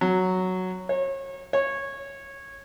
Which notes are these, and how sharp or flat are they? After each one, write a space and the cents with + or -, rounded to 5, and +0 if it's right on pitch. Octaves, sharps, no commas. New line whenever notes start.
F#3 +0
C#5 -30
C#5 -15